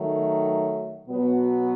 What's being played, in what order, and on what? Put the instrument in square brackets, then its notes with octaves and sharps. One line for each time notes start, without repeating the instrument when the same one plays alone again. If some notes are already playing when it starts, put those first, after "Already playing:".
Already playing: [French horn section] D#3 F#3 A3
B2 F#3 B3